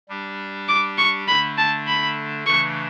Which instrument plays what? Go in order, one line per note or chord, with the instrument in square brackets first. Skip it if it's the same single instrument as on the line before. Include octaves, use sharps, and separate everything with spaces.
[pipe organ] G3 D4 G4
[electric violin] D6
C#6
[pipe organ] D3 A3 D4 [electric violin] B5
[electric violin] A5
B5
[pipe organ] C#3 E3 A3 D4 [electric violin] C#6